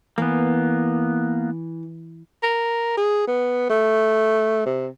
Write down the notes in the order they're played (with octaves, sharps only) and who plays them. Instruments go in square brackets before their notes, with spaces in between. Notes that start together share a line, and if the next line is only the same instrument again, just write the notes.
[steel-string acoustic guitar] E3 [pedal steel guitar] A#3 B3
[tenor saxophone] A#4
G#4
B3
A3
C3